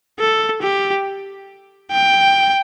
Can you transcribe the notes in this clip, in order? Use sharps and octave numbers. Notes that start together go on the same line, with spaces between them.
A4
G4
G5